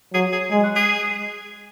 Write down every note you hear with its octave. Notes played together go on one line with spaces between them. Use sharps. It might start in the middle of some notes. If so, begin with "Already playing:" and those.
F#3 G#4
G#4
G#3 G#4
F#4
G#4